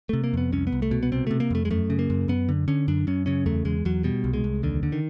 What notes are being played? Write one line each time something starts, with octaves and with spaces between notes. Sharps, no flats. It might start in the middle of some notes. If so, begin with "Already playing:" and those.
C3 A3
A#3
F2 B3
C2 C#4
B3
C2
A3
B2
B3
C3 C4
C3 A3
A#3
F2 A3
G#3
F#2 A3
C#3
A#3
F#2
F#2 B3
D3
D3 C#4
F#2 D4
F#2 C#4
C#3 C#4
E2 A3
E2 G#3
E2 F#3
B2 G3
C2
G#3
C2
D#2 D3
D3
D#3